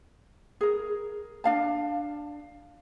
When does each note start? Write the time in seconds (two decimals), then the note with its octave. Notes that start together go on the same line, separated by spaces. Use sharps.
0.61 G#4 A#4
1.44 D4 F5 A5